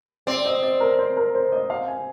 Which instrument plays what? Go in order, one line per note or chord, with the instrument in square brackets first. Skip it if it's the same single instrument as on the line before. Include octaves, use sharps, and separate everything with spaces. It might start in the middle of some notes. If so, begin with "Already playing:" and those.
[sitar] C4 [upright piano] D5
[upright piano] D#5
D5
A#4
C5
A#4
C5
D#5
F5
G#5